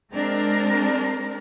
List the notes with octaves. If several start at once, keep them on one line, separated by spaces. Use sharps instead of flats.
G#3 C4 D4 A#4